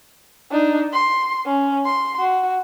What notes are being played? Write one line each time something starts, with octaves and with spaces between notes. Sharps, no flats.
D4 D#4
C6
C#4
C6
F#4